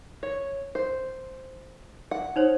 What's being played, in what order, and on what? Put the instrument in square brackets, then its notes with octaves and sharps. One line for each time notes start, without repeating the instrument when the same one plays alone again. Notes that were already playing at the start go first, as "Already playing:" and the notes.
[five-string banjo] C#5
C5
F#5
[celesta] D#4 C5 C#5